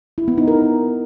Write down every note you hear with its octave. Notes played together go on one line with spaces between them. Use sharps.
E4
B3
D#4
A#4